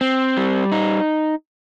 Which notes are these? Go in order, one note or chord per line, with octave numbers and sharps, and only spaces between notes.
C4
G3
D#4